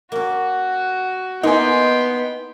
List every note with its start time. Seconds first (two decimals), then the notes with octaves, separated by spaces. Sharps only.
0.12 A#3 C#4 F#4
1.43 A#3 B3 D#4 E4 G5 G#5 C6